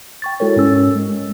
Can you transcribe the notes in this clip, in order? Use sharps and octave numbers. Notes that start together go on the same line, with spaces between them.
G5 C#6 A6
G#3 E4 F#4 A4 A#4 C#5
G#2 C#4 E6
G#3